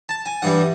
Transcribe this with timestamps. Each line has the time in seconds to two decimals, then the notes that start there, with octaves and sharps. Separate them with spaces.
0.09 A5
0.26 G#5
0.42 G2 E3 G3 F#5